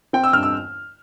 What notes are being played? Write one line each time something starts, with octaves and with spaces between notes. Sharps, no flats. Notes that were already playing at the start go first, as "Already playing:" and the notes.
C4 G5
E6
G2 F6
E6